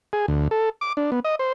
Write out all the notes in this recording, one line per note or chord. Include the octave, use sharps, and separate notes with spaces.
G#4
D2
A4
D6
D4
B3
D#5
C5